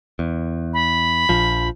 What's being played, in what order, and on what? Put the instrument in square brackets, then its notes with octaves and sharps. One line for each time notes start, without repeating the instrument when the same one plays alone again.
[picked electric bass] E2
[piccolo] B5
[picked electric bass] A#1 F3